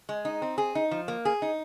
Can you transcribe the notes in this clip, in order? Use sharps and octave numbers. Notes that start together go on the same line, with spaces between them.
G#3
D#4
C4
G#4
D#4
F3
A#3
G#4
D#4